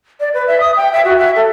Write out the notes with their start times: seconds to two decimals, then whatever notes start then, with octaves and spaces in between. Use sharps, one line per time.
0.20 D5
0.34 B4
0.47 E5
0.60 D#6
0.77 G5
0.93 E5
1.05 F#4
1.18 E5
1.36 A4